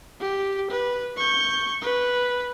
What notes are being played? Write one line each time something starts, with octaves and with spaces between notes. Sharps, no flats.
G4
B4
C#6 G6
B4